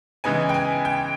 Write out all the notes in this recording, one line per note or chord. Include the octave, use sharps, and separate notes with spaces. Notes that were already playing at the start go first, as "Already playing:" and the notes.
C#3 E3 G#3 B3 D#4 G#5
G5
G#5
G5